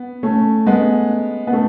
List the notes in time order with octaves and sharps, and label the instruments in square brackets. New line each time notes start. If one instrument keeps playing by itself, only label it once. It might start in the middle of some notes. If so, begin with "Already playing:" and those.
Already playing: [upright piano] B3
A3 C#4
G#3 B3
B3
A3